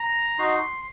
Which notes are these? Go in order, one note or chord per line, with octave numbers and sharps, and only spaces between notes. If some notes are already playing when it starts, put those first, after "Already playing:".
Already playing: A#5
D#4 F#4 C6